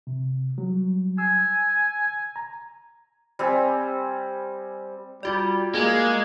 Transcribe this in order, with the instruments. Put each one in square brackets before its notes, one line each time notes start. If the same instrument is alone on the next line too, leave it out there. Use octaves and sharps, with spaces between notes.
[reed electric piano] C3
F#3 G3
[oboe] G#5 [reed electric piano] E6
[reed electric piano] A#5
[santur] G3 C4 G#5
[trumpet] G3 [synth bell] F4 F#4 D5
[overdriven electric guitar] G#3 [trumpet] A#3 [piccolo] G#6